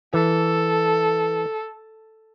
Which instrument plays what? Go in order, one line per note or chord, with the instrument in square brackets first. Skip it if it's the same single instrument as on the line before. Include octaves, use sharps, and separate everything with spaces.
[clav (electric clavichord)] E3 A5 [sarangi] A4